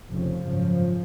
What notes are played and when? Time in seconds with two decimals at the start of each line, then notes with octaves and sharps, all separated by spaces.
0.11 F1 F2 C#3 F3
0.46 G#1 F#2 C#3